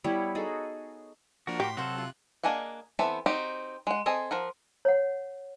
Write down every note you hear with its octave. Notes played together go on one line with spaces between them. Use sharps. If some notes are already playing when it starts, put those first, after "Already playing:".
G3 B3 E4 C#5
D#4 F#4 G#4 A4
F3 A#3 D4 F#4 A#4
A2 G4 G5 C6 D6 B6
C3 F#3 F#4 A4 C5 F5 F#6
F4
A#3 D4 G#4 D#5 F#5
E3 B3 C4 A4 E5
C4 D#4 F#4 G4
G#3 F#5
C4 G#4 A4 D#5
F3 A#4 F#5
C#5 F#5